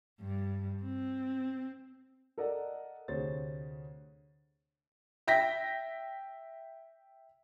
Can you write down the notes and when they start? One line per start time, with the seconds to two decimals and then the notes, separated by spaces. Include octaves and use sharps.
0.21 G2
0.83 C4
2.38 A4 A#4 D5 D#5 F#5
3.08 D2 C3 G#4 C5 C#5 A6
5.28 E5 G5 A#6 B6